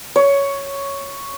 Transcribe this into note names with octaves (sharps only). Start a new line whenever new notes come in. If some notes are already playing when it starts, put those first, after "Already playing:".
C#5